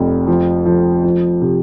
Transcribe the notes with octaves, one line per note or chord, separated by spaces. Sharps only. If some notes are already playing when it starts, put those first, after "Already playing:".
Already playing: F1 F2
F3
F3
F3
C3